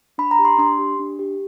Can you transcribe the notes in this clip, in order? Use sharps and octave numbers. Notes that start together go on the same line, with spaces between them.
D4 B5
A#5
G4
C6
D4 C6
G4
D4
G4